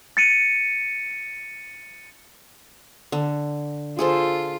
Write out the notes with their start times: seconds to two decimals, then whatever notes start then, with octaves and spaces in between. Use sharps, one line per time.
0.17 A6 C#7 D#7
3.12 D3
3.99 F4 G#4 A4 C5